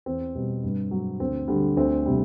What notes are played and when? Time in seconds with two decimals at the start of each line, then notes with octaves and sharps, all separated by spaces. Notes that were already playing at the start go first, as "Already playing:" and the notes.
0.06 E2 C4
0.35 B2 G3
0.63 G2
0.91 F#3
1.19 D2 C4
1.48 D3 G3
1.77 D2 C4
2.06 C3 G3